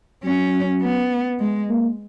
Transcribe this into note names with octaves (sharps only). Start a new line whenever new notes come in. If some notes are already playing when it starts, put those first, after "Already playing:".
F#3 C#4
B3
G#3
A#3